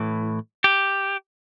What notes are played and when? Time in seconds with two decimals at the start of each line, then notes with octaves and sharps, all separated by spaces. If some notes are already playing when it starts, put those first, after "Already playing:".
Already playing: A2 E3
0.64 G4